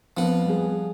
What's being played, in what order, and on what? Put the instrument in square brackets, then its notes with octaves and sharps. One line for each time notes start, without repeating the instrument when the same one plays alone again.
[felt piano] F2 B3 [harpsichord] F3 F#5
[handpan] G3 G#4